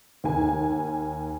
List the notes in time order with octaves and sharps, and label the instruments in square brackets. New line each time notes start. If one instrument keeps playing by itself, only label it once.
[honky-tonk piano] D#2 G#5